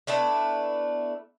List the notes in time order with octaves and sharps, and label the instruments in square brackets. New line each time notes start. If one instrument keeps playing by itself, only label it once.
[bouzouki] A3 B3 D4 E4